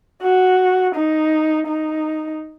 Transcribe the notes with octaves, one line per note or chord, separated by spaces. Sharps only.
F#4
D#4
D#4